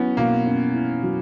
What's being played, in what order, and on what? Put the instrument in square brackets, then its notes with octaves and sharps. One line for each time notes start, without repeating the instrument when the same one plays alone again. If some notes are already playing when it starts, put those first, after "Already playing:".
Already playing: [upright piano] F#3 E4 [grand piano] B3 C#4
[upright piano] B2 [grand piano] A#3
[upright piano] C#4
E4
F#3